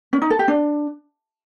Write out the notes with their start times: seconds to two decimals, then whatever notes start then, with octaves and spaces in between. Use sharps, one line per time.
0.13 C#4
0.22 D#4
0.30 A4
0.39 G4
0.48 D4